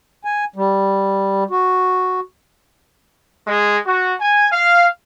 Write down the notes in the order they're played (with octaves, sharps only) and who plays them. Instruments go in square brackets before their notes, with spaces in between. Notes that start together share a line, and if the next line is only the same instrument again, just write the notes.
[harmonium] G#5
G3
F#4
[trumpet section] G#3
F#4
G#5
F5